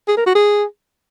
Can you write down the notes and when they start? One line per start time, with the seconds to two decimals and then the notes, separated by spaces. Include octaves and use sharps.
0.08 G#4
0.17 A#4
0.26 F#4
0.35 G#4